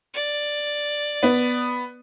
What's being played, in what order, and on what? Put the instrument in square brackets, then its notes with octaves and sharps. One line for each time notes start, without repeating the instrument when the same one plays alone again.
[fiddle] D5
[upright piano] B3